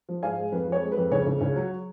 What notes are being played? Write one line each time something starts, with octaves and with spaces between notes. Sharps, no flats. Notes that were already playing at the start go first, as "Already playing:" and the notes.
F3
G#2 F5 G#5
G#3
F2 B4
F3
C#5
G#3
B4
F2
C#2 C#5
C#2
C#2
F#3